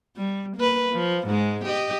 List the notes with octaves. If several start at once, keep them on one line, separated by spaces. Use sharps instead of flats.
G3
A#3 B4
F3
G#2 G#3
G4 D#5